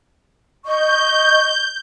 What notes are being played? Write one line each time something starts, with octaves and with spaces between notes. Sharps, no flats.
D#5 C#6 G6